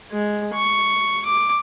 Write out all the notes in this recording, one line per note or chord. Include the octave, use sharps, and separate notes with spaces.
G#3
C#6
D6